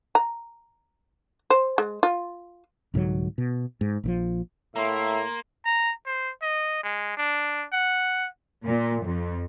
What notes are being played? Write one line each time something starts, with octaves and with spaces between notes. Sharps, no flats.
A#5
C5
G#3
F4
C2 G#2 D3 F#3
B2
G#2
A#1 C#3 F3
A2 A#3 E5 A#5 C6
A#5
C5
D#5
G#3
D4
F#5
A#2
F2